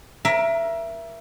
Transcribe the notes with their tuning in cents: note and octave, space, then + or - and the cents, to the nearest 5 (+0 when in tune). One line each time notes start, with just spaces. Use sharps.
A#4 +25 E5 +20